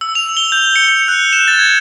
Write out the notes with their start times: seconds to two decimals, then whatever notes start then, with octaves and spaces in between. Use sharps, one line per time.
0.01 E6
0.15 F7
0.37 G7
0.52 G6
0.76 C#7
0.89 C#7
1.08 F#6
1.33 E7
1.48 A6
1.59 G#6